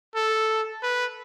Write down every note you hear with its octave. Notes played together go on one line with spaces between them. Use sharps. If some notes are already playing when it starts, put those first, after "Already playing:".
A4
B4